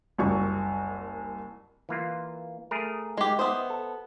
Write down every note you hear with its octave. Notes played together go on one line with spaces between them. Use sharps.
F#1 C2 C#6
E3 A#3 F4
A3 G#4 A#4
G#3 G4
B3 C5 D#5 E5
A4